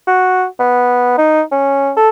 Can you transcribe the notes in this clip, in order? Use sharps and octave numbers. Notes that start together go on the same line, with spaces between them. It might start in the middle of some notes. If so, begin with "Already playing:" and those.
F#4
B3
D#4
C#4
A4